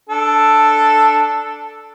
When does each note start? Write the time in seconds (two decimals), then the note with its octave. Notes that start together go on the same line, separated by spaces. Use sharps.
0.09 D4 A4